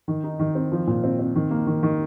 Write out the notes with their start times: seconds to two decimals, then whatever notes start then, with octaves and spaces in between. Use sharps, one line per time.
0.08 D#3
0.24 D#4
0.39 D#3
0.55 C4
0.72 F3
0.87 A#2
1.04 C4
1.19 C4
1.35 D#3
1.51 A#3
1.67 D#3
1.83 D#3